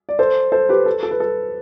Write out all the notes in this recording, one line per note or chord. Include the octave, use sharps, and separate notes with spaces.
D5
A4 C5
A4 C5
G4 B4
A4
A4
B4
A4